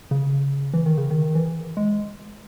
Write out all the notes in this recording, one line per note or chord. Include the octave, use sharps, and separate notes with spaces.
C#3
E3
D#3
C#3
D#3
E3
G#3